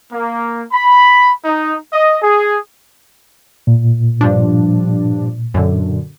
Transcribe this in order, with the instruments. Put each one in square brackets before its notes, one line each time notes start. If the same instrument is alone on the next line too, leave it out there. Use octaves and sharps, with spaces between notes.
[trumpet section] A#3
B5
D#4
D#5
G#4
[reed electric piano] A#2
[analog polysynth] G2 F3 D4
F#2 D3